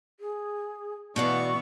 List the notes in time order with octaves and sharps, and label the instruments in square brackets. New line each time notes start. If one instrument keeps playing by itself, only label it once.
[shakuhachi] G#4
[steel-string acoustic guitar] B2 F#4 F5 [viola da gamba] E3 B3 [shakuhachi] D5 [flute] C#6